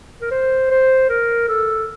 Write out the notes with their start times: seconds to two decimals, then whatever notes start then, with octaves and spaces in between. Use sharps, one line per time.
0.21 A#4
0.31 C5
0.70 C5
1.09 A#4
1.48 A4